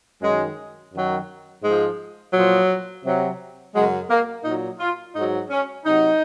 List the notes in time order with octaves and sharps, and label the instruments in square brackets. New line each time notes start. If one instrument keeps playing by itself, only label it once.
[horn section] F#2 D#3 F#3 G#3
F#2 D#3 F#3
G#2 F3 G#3
A#2 F3 F#3
C3 F#3
F#2 C#3 F#3 G#3
A#3
A#2 F#3 D#4
F4
G#2 F#3 D#4
C#4
C3 F#3 D#4